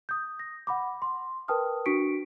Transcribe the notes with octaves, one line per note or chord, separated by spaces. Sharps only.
D#6 G6
A#6
F#5 B5 D6
C6
A#4 B4 G5 A5 D#6 F6
D4 F#4 C#6 B6 C#7 D7